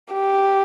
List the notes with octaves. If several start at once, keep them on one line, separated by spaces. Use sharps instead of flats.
G4